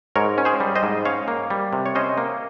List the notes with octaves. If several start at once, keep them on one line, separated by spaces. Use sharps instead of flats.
G#2 A#4 C#5
C#4
G#4 C5
G3
C5 D#5
G#2
C#4 C#5 F5
A#3
G3
C3
C#5
C#4 C5 D#5
A#3